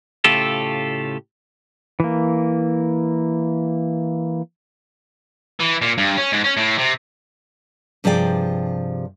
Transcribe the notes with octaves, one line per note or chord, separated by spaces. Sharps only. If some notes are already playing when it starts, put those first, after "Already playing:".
A2 C#3 A3 F4 G4 A4
E3 A#3
E3
A#2
G2
C#4
G#2
C#4
A2
C3
G2 C3 F3 G#4 D5 G5